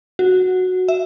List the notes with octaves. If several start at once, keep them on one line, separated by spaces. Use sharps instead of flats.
F#4
E5